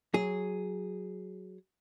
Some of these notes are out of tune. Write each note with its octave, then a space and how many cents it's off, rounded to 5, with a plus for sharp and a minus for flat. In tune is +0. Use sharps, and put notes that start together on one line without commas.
F#3 +0 G#4 +0